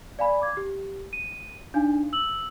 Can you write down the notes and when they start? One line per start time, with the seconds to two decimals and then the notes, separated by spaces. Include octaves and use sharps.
0.19 D5 F5 G#5 B5
0.42 D6 G#6
0.57 G4
1.13 D#7
1.74 D4 D#4 F5 G#5
2.13 E6 F#7